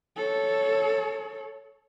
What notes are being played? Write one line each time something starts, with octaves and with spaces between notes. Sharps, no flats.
A4 C#5